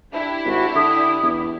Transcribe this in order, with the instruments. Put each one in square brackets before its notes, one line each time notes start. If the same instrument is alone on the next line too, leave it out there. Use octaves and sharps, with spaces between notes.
[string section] D4 E4 G4
[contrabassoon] G#1 [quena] F#4
[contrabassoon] D3 [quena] D#6
[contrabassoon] E2